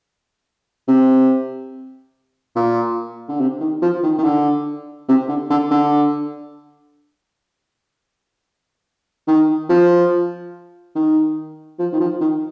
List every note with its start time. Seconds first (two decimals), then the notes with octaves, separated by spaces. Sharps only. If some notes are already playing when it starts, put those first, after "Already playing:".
0.88 C3
2.56 A#2
3.28 D3
3.40 C3
3.61 D#3
3.82 F3
4.03 D#3
4.18 D#3
4.24 D3
5.08 C3
5.28 D3
5.50 D3
5.71 D3
9.27 D#3
9.69 F3
10.95 D#3
11.79 F3
11.93 D#3
12.00 F3
12.21 D#3